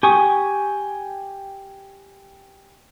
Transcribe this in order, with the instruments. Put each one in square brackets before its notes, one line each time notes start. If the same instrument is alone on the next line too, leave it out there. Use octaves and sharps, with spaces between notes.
[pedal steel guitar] G4 G#5 C#6 D#6